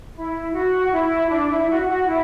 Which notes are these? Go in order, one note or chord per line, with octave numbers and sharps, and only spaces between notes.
E4
F#4
E4
D4
E4
F#4
F#4
E4